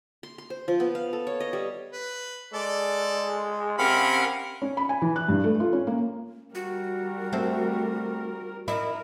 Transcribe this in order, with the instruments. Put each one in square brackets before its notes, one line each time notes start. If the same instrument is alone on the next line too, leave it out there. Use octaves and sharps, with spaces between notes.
[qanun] C6
C6
C5
F3
B3
F5
A4
C#5
D#5
G3
[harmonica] B4
[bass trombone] G#3 [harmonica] A4 D5
[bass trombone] C3 [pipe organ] C#4 A#4 F#5 [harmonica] F5 B5
[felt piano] C#4
B5
G#5
E3
F#6
G2
A3
F4
C#4
A#3
[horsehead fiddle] G3 A#4 [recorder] F#4
[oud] A3 C4
[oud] E4 [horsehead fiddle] A#4 [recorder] D#5